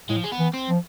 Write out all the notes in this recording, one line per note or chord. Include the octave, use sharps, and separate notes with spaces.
A2 G#3
F3
G#3
B3
E3
C4
F3